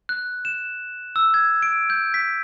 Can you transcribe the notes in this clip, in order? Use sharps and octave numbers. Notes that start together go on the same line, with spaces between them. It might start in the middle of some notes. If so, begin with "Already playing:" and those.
F#6
E7
E6
G#6
D7
G6
B6